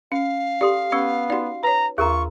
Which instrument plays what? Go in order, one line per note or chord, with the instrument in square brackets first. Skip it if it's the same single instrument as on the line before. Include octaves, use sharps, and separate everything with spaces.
[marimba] C#4 [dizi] F5
[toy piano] G4 A4 C6 [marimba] D5
[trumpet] B3 [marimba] C#4 [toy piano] D5 C#6 E6
[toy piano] D#4 F#4 [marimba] D5 F#5
[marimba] B4 C#5 [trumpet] A#5
[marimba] D#2 [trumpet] F4 [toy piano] G#4 A#4 A#5 [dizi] C#6